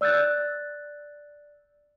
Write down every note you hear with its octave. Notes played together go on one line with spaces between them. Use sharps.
D5 E6 F#6 G6 A6